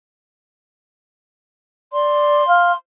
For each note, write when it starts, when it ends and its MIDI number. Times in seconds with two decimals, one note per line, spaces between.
1.93 2.45 74
1.93 2.75 84
2.47 2.72 77